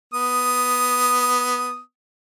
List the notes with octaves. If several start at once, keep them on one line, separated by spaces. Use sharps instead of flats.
B3 D#6